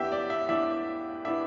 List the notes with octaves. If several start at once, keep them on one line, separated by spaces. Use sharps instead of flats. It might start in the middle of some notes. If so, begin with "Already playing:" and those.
Already playing: E2 E3 B3 D4 G4 E5 G5
D5
E5
E2 E3 B3 D4 E5
E3 B3 D4 E5